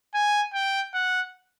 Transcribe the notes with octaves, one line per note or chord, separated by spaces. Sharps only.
G#5
G5
F#5